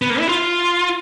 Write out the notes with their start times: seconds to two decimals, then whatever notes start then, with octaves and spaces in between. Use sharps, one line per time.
0.02 B3
0.10 A#3
0.19 E4
0.28 F4